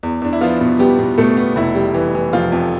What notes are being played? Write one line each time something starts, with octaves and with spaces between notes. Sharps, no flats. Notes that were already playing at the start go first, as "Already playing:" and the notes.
E2
E2 D4
E4
F3 B3 F4
B2
G3 B3 G4
B2
B2 A3 A4
B3
F1 E4
G3
E3
E3
F1 F3 F4
F2